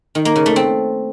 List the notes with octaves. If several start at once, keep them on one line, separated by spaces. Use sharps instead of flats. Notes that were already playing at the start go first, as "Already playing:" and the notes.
D#3
A#3
C#3
A3
C4